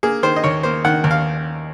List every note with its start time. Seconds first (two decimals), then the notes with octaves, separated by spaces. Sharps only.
0.03 A#3 G#4
0.23 D#3 C5
0.36 D#5
0.44 D#2 C#5
0.63 A#3 C5
0.85 D#3 F#5
1.04 D#2
1.11 F5